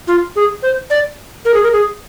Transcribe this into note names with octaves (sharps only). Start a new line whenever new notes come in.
F4
G#4
C5
D5
A#4
G#4
A#4
G#4